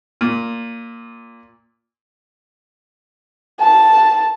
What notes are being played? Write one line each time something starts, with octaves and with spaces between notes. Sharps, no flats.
A#2
A5